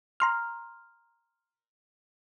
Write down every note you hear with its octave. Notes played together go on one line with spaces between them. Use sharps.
A#5 C6 F6